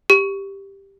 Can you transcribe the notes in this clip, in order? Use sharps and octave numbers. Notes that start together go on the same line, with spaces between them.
G4